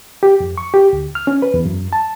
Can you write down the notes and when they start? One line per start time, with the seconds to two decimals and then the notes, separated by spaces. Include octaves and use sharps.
0.23 G4
0.40 F2
0.58 C#6
0.74 G4
0.93 D2
1.15 F6
1.27 C#4
1.42 B4
1.54 E2
1.66 F#2
1.93 A5